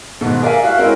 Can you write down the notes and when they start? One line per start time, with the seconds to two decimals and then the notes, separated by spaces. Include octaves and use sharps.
0.21 G#2 B2 D#3 A3
0.42 G#4 A#4 D5 E5 F5 G#5
0.63 F#4 E5 F5
0.78 G#3 C4 C#4 E4 A#4